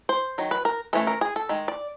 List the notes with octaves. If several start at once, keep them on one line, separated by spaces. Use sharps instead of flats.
C5
D#3 F#3
B4
A#4
E3 A3 C#4 A4
A#4
G#4
A4
D#3 G#3
D5